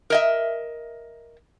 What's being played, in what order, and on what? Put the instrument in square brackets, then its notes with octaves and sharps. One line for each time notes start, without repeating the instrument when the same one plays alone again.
[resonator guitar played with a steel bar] A#4 D#5 E5